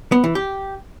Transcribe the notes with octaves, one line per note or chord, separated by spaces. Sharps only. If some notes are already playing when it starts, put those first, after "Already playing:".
B3
E3
G4